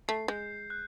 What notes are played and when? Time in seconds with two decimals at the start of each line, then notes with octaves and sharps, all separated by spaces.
0.08 A3 C7
0.28 G#3 G6
0.70 F#6